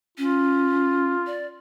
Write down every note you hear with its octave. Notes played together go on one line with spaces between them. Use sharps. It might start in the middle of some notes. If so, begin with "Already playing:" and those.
C#4 F4
D5